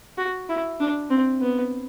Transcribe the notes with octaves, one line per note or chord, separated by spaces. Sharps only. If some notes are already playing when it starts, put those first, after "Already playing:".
F#4
E4
D4
C4
B3